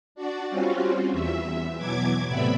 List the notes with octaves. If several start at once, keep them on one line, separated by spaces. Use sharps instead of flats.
D4 F#4 D5
G3 C4 C#4 F4 F#4
E2 E5
B2 E3 F#3 D6 G#6
A2 C3 B3 D5 E5 B5